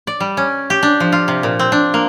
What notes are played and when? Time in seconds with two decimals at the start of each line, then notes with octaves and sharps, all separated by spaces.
0.07 D5
0.20 G3
0.37 C#4
0.70 G4
0.83 D4
1.00 F3
1.12 F4
1.28 C3
1.43 A#2
1.59 C4
1.72 D4
1.94 A#3